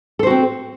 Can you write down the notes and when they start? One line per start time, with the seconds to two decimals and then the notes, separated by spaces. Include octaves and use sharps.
0.19 A4
0.23 C5
0.27 F#4
0.30 C4